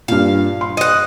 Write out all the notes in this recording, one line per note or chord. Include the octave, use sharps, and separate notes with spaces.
G2 A#2 F5
C6
D#5 F#5